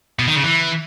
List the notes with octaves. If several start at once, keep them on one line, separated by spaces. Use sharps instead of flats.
B2
D#3
C#3
E3